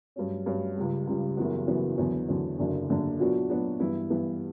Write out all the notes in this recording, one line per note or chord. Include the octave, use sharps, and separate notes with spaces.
G2 F#3 C#4
G2 F#3 C#4
C#2 C#3 G3
C#2 C#3 G3
F#1 F#2 E3 B3 F#4
F#1 F#2 E3 B3 F#4
E2 D3 F#3 B3
E2 D3 F#3 B3
F#1 F#2 D3 A#3 D4
F#1 F#2 D3 A#3 D4
A#2 F#3 B3 D4 F#4
A#2 F#3 B3 D4 F#4
G2 E3 B3 E4
G2 E3 B3 E4